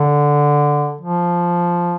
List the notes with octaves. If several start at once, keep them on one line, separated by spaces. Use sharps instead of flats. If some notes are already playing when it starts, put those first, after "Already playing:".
Already playing: D3
F3